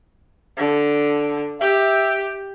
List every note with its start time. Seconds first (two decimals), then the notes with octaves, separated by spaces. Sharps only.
0.57 D3
1.61 G4 E5